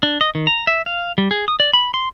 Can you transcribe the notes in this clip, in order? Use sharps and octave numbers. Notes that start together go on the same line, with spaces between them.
D4
D#5
D#3
A#5
E5
F5
G3
G#4
D#6
D5
B5
C6